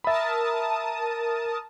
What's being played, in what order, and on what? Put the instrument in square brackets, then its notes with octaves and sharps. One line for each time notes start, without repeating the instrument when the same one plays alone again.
[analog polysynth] A#4 A5 D#6 [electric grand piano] E5 B5